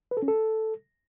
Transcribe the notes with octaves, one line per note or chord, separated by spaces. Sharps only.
B4
A4
C#4
A4